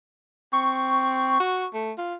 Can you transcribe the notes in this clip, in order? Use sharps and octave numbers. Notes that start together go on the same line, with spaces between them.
C4 C#6
F#4
A3
F4